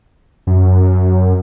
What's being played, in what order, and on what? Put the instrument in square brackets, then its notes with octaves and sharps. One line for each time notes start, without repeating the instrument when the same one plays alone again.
[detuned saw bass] F#2